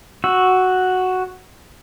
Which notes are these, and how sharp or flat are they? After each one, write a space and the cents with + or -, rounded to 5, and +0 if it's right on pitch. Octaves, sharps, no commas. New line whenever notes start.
F#4 +0 E6 +0